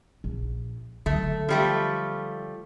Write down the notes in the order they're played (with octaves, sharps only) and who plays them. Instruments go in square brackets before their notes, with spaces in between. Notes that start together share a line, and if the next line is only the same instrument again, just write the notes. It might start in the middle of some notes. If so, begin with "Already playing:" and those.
[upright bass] A#1
[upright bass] D3 F#3 [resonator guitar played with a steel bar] A3
[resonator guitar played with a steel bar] F3 G3 A3